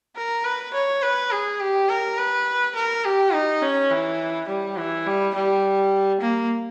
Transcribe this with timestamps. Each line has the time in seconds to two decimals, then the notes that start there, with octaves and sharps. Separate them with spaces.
0.16 A#4
0.45 B4
0.74 C#5
1.02 B4
1.31 G#4
1.60 G4
1.89 A#4
2.18 B4
2.75 A#4
3.04 G4
3.33 D#4
3.62 C#4
3.91 E3
4.48 G3
4.77 E3
5.06 G3
5.34 G3
6.21 A#3